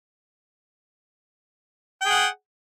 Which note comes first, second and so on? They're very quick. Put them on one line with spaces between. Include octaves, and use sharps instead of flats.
G5 G#4 F#5